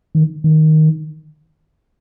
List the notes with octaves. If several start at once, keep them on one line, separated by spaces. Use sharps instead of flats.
D#3
D#3